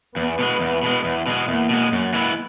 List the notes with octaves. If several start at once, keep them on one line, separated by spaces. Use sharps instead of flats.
E2 B3
B2 G#3
E2
B2 G#3
E2
B2 G#3
E2 A#3
B2 G#3
F#2
E3 G#3 B3 E4